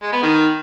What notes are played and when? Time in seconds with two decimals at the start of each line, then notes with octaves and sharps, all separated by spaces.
0.02 G#3
0.12 B3
0.23 D#3